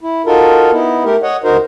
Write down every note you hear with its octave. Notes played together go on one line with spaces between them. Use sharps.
E4
D#4 F4 F#4 A4 A#4
B3 D#4 E4
A3 G4 A#4
C#5 D#5 F#5
D2 D#4 F#4 A#4 C5